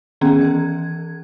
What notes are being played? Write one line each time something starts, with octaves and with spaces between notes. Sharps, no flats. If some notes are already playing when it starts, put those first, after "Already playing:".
D#3 B3 C#4 G#4 A#5 G#6
E3 G#6